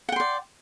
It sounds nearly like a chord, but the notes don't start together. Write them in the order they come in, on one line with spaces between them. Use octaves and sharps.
F#5 G5 C6 D5